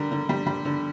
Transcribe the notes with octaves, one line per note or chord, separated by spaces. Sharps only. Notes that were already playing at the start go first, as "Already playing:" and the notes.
Already playing: D3 G3 A#4
D3
G3
G3
D3